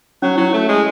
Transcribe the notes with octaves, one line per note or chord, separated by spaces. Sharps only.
F#3 C#4
F#3 E4
A3 C#5
G#3 C#5